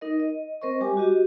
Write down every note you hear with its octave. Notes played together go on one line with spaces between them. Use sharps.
D#4 A#4 D#5
D#5
C4 A#4 C5 D#5 C#6
G3 G4 G#5 D6
F#4 G4 D#5